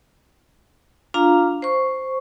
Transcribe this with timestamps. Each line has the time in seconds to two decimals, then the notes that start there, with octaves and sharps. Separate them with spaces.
1.14 D4 F4 F5 A#5
1.62 C5 C#6